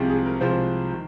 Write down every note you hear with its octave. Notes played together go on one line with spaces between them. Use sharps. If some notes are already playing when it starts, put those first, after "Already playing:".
Already playing: C2 C3 F3 G#3 C4
G#4
A#4
C2 C3 F3 G#3 C4 C5
D#3